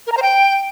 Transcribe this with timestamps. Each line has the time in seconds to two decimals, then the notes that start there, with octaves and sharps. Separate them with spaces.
0.07 A#4
0.12 A#5
0.17 C5
0.22 G5